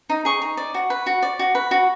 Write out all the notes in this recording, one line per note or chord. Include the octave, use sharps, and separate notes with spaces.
D#4
G#4 C#6
D#4
D5
F#4
B4
F#4
D5
F#4
B4
F#4